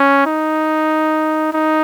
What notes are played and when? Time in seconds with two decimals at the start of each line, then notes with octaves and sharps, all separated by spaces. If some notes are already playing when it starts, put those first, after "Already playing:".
Already playing: C#4
0.27 D#4
1.54 D#4